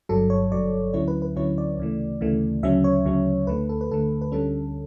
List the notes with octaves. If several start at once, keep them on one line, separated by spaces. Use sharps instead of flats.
G1 G2 F#3 A4
C#5
G1 G2 F#3 D5
D2 D3 F#3 C#4 E4 C#5
B4
B4
D2 D3 F#3 C#4 E4 C#5
D5
D2 C#3 E3 A3
D2 C#3 E3 A3
D2 C#3 F#3 C#4 E5
C#5
D2 C#3 F#3 C#4
D2 D3 A3 B4
A4
B4
D2 D3 A3 A4
B4
D2 D3 G3 C#4 A4